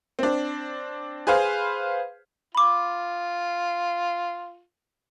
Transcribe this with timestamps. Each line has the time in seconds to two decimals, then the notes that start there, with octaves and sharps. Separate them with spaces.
0.19 C4 D4
1.27 G#4 B4 C5 F5
2.55 F4 B5 D6